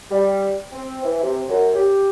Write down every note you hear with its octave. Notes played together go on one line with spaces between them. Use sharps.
G3
C4
E3
C3
F#2
G4